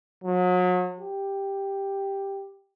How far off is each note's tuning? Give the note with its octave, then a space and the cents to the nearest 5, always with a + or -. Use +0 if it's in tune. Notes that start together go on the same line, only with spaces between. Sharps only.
F#3 -35
G4 +5